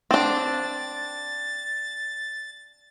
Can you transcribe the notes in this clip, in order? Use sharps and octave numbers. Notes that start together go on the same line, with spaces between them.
C4 D4 A6